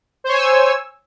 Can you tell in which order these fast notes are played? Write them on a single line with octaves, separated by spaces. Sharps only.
C5 C#5 G#5 E6